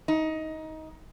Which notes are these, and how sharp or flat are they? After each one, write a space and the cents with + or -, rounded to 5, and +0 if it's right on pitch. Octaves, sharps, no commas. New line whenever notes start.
D#4 +20